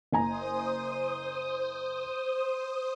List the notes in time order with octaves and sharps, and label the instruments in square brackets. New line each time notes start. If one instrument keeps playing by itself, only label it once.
[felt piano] F#1 G#5 A#5 [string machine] C5 D#6